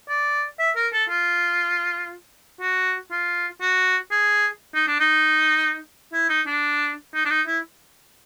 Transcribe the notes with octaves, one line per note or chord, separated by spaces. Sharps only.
D5
E5
A#4
A4
F4
F#4
F4
F#4
G#4
D#4
D4
D#4
E4
D#4
D4
D#4
D4
D#4
E4